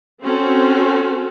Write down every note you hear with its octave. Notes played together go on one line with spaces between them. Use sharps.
C4 C#4 F#4 A4